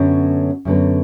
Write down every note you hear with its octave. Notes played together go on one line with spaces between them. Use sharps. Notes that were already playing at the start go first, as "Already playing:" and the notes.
Already playing: F#2 D3 F#3 B3
F#2 D3 F#3 B3